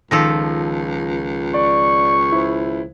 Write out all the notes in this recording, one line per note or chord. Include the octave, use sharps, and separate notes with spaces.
C#2 D#3 F3 A4 A#6 B6
D5 C#6
E4 C5